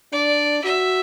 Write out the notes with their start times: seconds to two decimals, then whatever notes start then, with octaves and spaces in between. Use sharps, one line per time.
0.12 D4 D5
0.64 F#4 E5